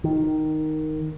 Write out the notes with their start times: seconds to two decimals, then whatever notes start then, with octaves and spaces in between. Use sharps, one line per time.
0.04 D#3